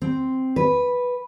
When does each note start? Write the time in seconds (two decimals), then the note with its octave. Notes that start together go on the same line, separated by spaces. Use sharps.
0.02 C4
0.56 B4